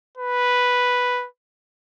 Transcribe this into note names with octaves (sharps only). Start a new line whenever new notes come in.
B4